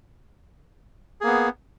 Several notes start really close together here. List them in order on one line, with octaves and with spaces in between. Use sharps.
G#4 A#3 B3